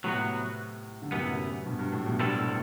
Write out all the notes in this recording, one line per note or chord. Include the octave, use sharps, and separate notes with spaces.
A2 C3 F#3 B3 F#4
D3
F#2 A2 C3 E3 B3
G2 B2
G2
A2
G2 B2
G2 B2 G3 C4 E4 A4
A2 C3